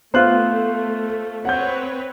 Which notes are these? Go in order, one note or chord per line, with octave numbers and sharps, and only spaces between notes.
A3 B3 F4 C5 F#6
C4 B4 C#5 F#5 G6